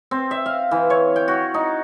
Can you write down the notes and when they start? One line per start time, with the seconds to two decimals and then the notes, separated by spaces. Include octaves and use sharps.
0.11 C4
0.31 E5
0.46 F5
0.71 E3
0.90 C#5
1.16 G5
1.28 F#4
1.54 D#4